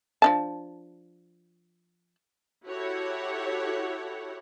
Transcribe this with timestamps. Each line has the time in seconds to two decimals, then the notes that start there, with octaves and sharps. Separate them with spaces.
0.22 F3 D4 A5
2.66 E4 F#4 G4 A4 C#5 F#5